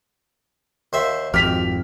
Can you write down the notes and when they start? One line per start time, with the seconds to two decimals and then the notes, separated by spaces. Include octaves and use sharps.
0.93 D#2 C5 E5
1.34 G#1 F2 G4 F6 B6 F7